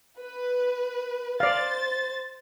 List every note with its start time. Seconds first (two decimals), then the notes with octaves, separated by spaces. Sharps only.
0.19 B4
1.40 C5 D5 F5 A6